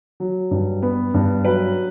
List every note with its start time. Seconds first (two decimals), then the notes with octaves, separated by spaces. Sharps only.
0.20 F#3
0.51 G2
0.82 B3
1.14 G2
1.45 F#3 B4